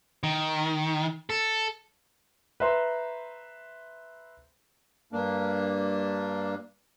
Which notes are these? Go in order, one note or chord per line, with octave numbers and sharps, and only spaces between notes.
D#3
A4
B4 C5 E5 A#5 C6
G2 A#3 D4